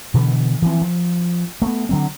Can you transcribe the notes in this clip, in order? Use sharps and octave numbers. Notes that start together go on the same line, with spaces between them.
B2 D3 E3
E3 F3 C4
F3
A3 B3
D3 F#3 C4